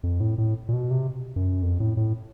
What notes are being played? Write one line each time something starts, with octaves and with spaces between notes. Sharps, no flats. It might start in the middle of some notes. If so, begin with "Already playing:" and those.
F2
A2
A2
A#2
B2
C3
F#2
F2
A2
A2